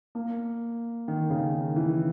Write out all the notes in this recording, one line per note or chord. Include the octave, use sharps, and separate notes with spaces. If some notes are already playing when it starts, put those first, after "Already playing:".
A#3
D#3
C#3
D#3
E3